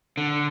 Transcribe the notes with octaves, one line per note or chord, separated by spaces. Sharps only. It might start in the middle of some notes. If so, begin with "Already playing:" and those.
D3